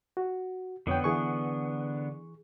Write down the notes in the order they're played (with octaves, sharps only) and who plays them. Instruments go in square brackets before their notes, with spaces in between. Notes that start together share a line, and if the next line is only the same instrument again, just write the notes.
[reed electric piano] F#4
[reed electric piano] F2 C#5 G5 [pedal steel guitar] D3 B3
[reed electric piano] E3 G#4 C#6